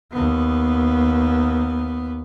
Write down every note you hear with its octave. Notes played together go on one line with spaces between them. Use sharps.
D#2 B3